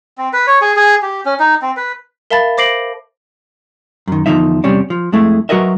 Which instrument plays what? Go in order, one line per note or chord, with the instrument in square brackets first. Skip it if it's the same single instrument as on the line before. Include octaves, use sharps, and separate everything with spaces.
[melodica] C4
B4
C#5
G#4
G#4
G4
C#4
D#4
C4
B4
[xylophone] A#4 E5 F5 A5 B5 A6
C5 D6 A#6 C7 D7 F#7
[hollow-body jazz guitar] F#2 D#3
E2 G2 D3 F3 D#4 E5
E2 C3 G3 C#4 D4
F3
F2 G#3 A3 E4
F#3 F#4 A#4 B4 D#5 E5